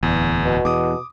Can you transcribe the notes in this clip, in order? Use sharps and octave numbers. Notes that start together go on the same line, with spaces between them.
D1 E2
B2
E2 D6 D#6